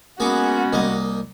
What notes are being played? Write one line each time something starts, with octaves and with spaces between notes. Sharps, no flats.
G#3 A#3 B3 C#4 F#4 G#4
C2 A#3 D#5